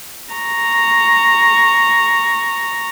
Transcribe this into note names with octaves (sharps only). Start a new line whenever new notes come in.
A#5 C#6